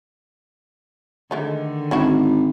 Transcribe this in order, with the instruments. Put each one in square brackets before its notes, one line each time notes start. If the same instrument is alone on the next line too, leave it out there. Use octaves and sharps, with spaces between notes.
[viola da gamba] D3 D#3 [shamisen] G#3 A3 D#4
[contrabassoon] G#1 [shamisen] C#4 E4 F#4